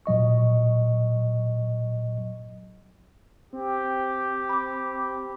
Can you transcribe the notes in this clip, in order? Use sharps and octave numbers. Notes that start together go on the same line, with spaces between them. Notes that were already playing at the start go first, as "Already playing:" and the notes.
A#2 F#3 D#5 C#6
C4 G4
B5 D6